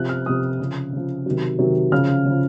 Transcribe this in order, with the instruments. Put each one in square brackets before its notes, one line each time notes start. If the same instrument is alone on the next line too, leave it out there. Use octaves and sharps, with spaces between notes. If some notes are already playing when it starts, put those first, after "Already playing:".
Already playing: [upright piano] C3 F3 F#6
F6
C3 F3 D#6
C#3 F3
C#3 F3
C3 D#3 F#3
C3 D#3 F#3
C#3 F3 F6
C#3 F3